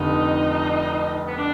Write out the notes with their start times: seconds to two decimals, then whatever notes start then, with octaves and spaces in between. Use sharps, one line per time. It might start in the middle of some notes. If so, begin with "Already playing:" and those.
Already playing: F1 F2 D3 D#4
1.28 B3
1.37 D4